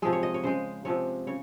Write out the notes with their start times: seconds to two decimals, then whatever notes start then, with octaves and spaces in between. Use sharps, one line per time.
0.02 C3 F3 G#3 G#4
0.13 C#5
0.23 D#5
0.34 C#5
0.43 C#3 G#3 C5
0.85 C3 F3 G#3 C#5
1.27 C#3 C#5